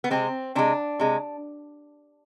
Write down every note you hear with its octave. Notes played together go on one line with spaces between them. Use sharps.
B3
C3 G#3 C4
C3 G#3 D4
C3 G#3